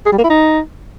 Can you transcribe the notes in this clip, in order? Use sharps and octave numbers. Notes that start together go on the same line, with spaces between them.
G#4
G3
A#3
E4
D#4